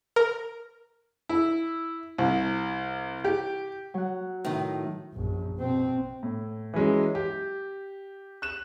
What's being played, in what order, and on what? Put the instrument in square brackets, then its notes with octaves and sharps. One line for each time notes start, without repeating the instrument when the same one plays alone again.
[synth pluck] A#4
[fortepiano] E4
C2
G4
[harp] F#3 F#5
[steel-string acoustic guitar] A2 D#3
[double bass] A#1 F#2
B2 C4
[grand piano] A2
E3 F#3 G#3 C#4
G4
F#6 E7